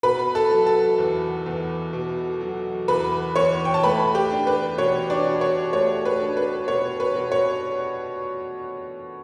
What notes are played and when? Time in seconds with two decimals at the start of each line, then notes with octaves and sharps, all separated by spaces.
0.03 B2 B4 B5
0.35 A4 A5
0.51 F#3
0.66 A4 A5
0.98 E2
1.46 E2
1.93 B2
2.41 F#3
2.88 E2 B4 B5
3.36 E2 C#5 C#6
3.65 G5
3.74 A5
3.83 A3 B4 B5
4.15 G4 G5
4.31 D4
4.47 B4
4.78 B2 C#5
5.10 D4 D5
5.26 B2
5.41 C#5
5.73 A3 C#5
6.05 B4
6.20 D4
6.37 B4
6.68 B2 C#5
7.00 B4
7.16 B2
7.32 C#5